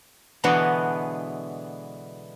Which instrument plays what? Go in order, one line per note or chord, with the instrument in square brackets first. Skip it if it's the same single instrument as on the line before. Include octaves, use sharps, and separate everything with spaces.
[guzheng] B2 D3 E3 G#3 B3 F#4